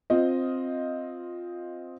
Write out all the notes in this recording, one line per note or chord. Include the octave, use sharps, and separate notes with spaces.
C4 F4 D#5